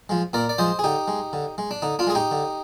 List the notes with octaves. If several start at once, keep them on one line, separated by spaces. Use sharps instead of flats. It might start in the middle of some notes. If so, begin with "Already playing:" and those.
F3 G#3
A#2 A#4 D5
D5
F3 G#3 C5 D#5
G#4
D3 D#4 G4
G#3
D3
G#3
D4
D3 D#4
D4 F4
G#3 G#4
D#4 G4
D3